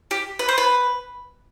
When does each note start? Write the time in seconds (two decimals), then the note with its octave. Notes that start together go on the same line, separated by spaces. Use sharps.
0.11 G4
0.39 B4
0.49 C5
0.58 B4